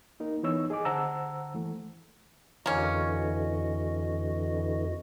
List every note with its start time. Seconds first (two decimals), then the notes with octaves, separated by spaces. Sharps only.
0.20 A#3 D#4 A#4
0.43 E3 B3 D#4 C#5 E6
0.70 G#4 D#5 G#5 D6
0.85 D3 C5 F#5 A5 A#5 E6
1.55 E3 A3
2.66 F2 D3 E3 A#3 C#4 F#4 D#5